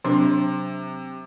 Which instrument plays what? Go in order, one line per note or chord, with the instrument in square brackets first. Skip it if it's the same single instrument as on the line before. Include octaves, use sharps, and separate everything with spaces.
[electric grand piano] C3 [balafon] F#3 D4